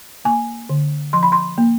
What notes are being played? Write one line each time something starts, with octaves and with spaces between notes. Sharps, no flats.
A#3 G#5
D3
F3 C6
B5
C6
A#3